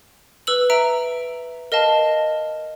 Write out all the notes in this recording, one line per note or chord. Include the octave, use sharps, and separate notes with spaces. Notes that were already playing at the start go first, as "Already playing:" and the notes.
B4 E6 F#7
E5 A#5 D7
A#4 D#5 F5 A5